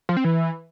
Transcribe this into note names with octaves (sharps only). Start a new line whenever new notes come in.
F3
C4
E3